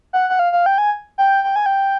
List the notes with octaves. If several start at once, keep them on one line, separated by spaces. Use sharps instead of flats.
F#5
F#5
F5
F5
G5
G#5
G5
G5
G#5
G5